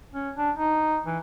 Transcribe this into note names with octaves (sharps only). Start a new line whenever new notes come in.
C#4
D4
D#4
E3